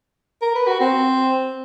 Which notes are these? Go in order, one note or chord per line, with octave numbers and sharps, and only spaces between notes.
A#4
B4
F#4
C4